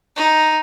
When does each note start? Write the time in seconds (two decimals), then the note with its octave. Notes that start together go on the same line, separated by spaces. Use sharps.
0.16 D#4